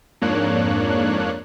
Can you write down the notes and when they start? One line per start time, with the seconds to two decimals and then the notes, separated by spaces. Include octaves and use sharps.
0.22 F2 G#2 A#3 D4 C#5 F#6